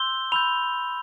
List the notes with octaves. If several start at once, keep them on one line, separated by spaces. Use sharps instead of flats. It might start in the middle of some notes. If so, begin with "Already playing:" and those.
Already playing: C6 E6 G6 G7
B5 E6 G6 F7